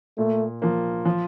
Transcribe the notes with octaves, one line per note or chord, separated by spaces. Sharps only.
A#2 A3
F3 A#3
F3